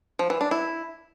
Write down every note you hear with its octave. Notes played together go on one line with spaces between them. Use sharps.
F3
E3
D4
E4